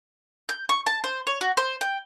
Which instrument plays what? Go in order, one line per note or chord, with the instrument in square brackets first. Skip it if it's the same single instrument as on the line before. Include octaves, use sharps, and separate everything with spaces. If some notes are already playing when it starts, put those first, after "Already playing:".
[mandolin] G6
C#6
A5
C5
C#5
F#4
C5
G5